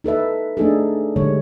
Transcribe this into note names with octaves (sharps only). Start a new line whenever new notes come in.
D#4 A4 B4 E5
A3 D4 D#4 G#4 A4
D3 G3 G#3 C#5